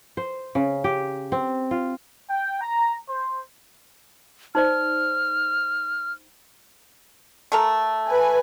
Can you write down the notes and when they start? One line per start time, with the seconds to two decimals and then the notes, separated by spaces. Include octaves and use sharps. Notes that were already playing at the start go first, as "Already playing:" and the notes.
0.17 C5
0.55 C#3
0.84 G4
1.32 C4
1.71 F4
2.30 G5
2.61 A#5
3.09 C5
4.55 D#4 C5 D5 F6
7.52 A3 A#4 A#5
8.07 B4 G#5